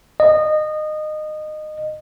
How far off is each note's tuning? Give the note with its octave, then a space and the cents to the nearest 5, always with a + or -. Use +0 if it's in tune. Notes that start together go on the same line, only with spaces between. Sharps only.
D#5 -20